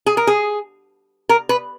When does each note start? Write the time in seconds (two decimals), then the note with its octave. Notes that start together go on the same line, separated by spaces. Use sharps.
0.06 G#4
0.17 A#4
0.27 G#4
1.29 A#4
1.49 B4